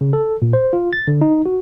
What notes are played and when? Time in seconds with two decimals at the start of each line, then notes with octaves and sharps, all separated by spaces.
0.01 C#3
0.13 A4
0.42 A#2
0.53 C5
0.73 F4
0.93 A6
1.08 D3
1.21 D#4
1.46 F#4